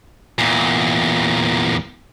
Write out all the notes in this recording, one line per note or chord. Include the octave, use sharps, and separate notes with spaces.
E2 A#2